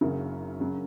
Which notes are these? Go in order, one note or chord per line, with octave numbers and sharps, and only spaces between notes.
F#1 F#2 C#3 F#3 A#4
F#2 C#3 F#3